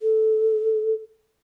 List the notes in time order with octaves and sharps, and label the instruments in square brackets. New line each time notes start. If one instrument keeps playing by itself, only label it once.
[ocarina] A4